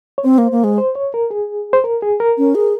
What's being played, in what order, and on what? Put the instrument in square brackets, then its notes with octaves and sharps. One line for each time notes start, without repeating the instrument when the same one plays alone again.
[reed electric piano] C#5
[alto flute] C4 [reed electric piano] C5
[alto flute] A#3
A#3
G#3
[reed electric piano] C5
C#5
A#4
G#4
C5
A#4
G#4
A#4
[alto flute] C#4
G#4